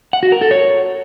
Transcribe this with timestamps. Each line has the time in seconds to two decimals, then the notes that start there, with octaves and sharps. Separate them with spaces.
0.13 F#5
0.23 F#4
0.32 A#4
0.42 A4
0.51 C#5